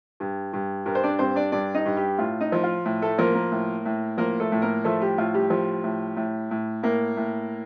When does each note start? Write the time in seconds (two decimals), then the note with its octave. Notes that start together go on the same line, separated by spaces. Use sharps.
0.20 G2
0.53 G2
0.86 G2 A#4
0.95 C5
1.03 D4 D5
1.19 G2 C4 C5
1.35 D4 D5
1.52 G2 D4 D5
1.74 D#4 D#5
1.85 G2
1.97 G3 G4
2.18 A2 F4
2.41 D#4
2.52 F3
2.63 F4
2.85 A2
3.02 A3 A4
3.18 F3 A#3 A#4
3.35 A#3 A#4
3.52 A2
3.86 A2
4.18 F3 A#3 A#4
4.40 A3 A4
4.52 A2
4.62 A#3 A#4
4.84 F3 A3 A4
5.01 G3 G4
5.18 A2 F4
5.34 G3 G4
5.50 F3
5.84 A2
6.17 A2
6.51 A2
6.83 A2 A#3 A#4
7.17 A2